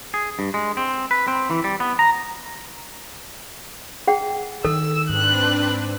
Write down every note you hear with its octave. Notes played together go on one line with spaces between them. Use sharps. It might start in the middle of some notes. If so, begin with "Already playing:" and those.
G#4
G2
G#3
C4
B4
C4
E3
G3
B3
A#5
G#4 F#5 G5
D#3 A4 E6
G#2 C4 D4 B4 F#6